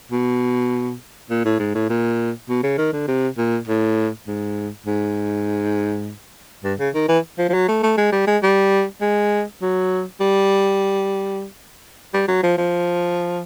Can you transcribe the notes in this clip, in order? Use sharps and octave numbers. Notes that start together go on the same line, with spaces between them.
B2
A#2
A2
G#2
A2
A#2
B2
C#3
D#3
D3
C3
A#2
A2
G#2
G#2
G2
C#3
D#3
E3
F3
F3
F#3
A3
A3
G#3
G3
G#3
G3
G#3
F#3
G3
G3
F#3
F3
F3